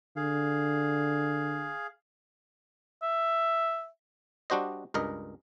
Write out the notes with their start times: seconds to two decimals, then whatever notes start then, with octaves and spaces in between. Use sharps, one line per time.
0.16 D3 G#4 F5
3.02 E5
4.50 G3 D4 F#4 C5 D#5
4.94 C#2 G2 A#4 D#5